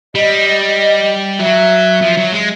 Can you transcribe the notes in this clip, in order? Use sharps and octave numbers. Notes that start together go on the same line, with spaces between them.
G3 D#5
F#3 E5
F3
F#3
G#3